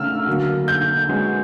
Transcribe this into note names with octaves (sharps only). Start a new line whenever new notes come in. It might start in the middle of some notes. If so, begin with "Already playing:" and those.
Already playing: C#3 A3 C#4 E6 F6
D3 F#3 A#3
G6
G#3 C#4 F#4 B4